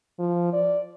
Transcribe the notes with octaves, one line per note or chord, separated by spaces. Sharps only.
F3
D5